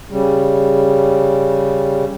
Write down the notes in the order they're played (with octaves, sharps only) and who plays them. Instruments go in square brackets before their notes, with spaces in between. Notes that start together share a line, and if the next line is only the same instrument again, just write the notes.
[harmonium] C#3 G3